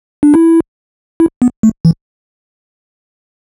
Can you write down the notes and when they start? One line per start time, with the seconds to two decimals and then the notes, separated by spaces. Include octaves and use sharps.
0.23 D4
0.34 E4
1.20 E4
1.42 B3
1.63 A3
1.85 E3